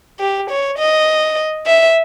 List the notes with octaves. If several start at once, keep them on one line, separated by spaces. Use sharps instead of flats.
G4
C#5
D#5
E5